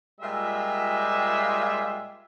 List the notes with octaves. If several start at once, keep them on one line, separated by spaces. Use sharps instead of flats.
A#2 G3 G#3 F4 E5